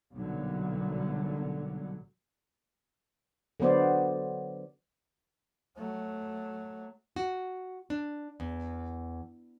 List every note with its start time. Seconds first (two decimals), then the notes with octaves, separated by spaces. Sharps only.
0.15 B1 A#2 D3 F#3 G3
3.60 D3 F#3 B3 C5 D5
5.77 F#3 A3
7.16 F#4
7.90 D4
8.40 E2